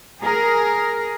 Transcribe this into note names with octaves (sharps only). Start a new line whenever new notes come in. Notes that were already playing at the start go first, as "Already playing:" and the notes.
G#4 A#4